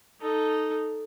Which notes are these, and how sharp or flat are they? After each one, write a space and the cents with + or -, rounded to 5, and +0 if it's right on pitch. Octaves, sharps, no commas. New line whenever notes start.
D#4 -5 A4 +0